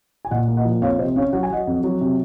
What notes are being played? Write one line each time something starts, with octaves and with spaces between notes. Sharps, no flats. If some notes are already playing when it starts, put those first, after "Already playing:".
G#5
A#2 D#5 F#5
A#3
D#5 F#5
F3
F2 C#5 F5
C3 C5 D#5
C#4 C#5 F5
F#3 F#5
G#5
F#3 D#5 F#5
F2
F#3
C3